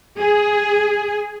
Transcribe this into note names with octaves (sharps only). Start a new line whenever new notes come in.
G#4